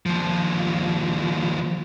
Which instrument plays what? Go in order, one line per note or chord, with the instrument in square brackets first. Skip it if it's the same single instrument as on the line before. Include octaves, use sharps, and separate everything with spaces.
[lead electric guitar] D#2 F3